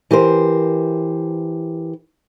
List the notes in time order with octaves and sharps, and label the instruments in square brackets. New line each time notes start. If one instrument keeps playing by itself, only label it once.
[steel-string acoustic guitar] E3 G4 A#4 C5